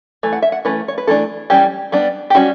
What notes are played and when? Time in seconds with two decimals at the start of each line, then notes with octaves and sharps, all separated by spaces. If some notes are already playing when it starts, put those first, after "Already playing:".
0.23 E3 A3
0.33 F#5
0.42 E5
0.52 F#5
0.65 E3 A3 C#4 B4
0.88 C#5
0.98 B4
1.07 E3 A3 D4 A4
1.50 E3 G3 C#4 G4
1.92 G3 B3 D4
2.30 G4
2.35 G3 C#4 F#4